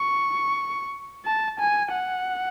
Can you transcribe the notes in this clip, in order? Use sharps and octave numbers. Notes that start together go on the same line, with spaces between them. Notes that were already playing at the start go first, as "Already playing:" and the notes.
Already playing: C#6
A5
G#5
F#5